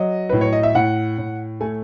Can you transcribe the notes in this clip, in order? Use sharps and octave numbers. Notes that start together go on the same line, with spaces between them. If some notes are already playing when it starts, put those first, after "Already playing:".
Already playing: F#3 D#5
A2 B4
C#5
D#5
E5
A2 F#5
A2
A3 G#5